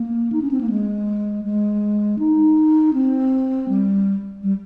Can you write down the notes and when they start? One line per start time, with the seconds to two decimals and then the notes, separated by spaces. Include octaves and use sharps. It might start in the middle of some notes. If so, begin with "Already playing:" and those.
Already playing: A#3
0.32 D#4
0.42 C#4
0.51 C4
0.61 A#3
0.70 G#3
1.44 G#3
2.19 D#4
2.94 C4
3.69 G3
4.43 G3